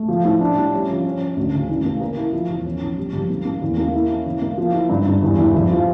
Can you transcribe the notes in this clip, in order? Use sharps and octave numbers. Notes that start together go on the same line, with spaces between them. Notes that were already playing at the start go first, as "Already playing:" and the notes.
Already playing: A3
F3
A2
D4
G3
C#4
F3
C#4
C#4
D2
C#3
A1
A#3
A#4
E4
F3
E1
C#4
A#1
G3
F2
A#3
A#3
E2
A#3
E4
C#4
E3
A#3
F3
E4
G2
G2
E2
E3
F2
F3